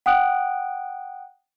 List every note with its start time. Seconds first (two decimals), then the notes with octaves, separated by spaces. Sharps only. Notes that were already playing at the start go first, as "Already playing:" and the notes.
0.06 F#5 G5 D#6 F#6 D7